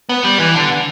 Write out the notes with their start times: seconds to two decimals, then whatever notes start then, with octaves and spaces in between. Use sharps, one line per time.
0.09 B3
0.24 G3
0.40 E3
0.55 D3